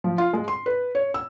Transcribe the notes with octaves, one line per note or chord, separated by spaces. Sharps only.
F3
F4
G#3
C6
B4
C#5
E6